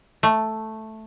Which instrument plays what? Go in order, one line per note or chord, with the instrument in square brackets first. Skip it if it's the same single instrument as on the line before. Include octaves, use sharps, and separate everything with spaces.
[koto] A3